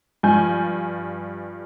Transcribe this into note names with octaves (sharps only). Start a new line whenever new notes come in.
G2 F3 G#5 G6